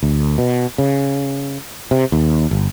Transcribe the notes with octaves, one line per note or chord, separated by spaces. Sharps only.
D2
B2
C#3
C3
D#2
G1